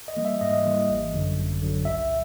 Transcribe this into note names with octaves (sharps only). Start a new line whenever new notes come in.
D#5
E3 G3 A#3
E5
G#2 D#5
E3 G3 A#3
G#1
F#2 D3 F#3
G#1
F#2 D3 F#3
C2 E5
A#2